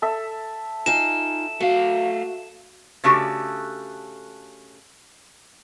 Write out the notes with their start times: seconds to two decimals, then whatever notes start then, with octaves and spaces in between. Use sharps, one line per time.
0.02 A4 E5
0.86 D#4 F4 G#5 E7
1.61 A3 F#4 F5
3.04 C#3 A3 D4 F#4 G4 A4